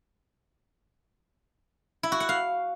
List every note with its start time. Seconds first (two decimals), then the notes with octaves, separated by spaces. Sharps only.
2.03 E4
2.12 F#4
2.20 F#5
2.29 F5